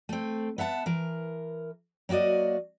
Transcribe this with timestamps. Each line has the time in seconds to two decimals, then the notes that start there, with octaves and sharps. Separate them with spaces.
0.09 A3 C4
0.58 B3 E5 F#5 A5
0.86 E3 A#4
2.09 F#3 A#3 F#4 D5 D#5